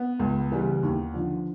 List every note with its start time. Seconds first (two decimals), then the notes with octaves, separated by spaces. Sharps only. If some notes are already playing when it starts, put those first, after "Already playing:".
Already playing: B3
0.19 C#2
0.52 C#3 E3 G3
0.83 D#2
1.14 D3 F3